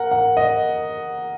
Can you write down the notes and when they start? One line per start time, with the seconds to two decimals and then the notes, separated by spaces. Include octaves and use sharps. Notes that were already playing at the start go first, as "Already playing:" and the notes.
Already playing: A#4 F#5
0.11 F#5
0.37 D#5